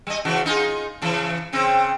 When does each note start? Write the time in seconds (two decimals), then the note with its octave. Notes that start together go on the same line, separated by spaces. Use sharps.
0.07 G3 D#5
0.25 C#3 E3 F#4
0.46 D#4 F4 G#4
1.02 C#3 E3
1.53 C#3 C4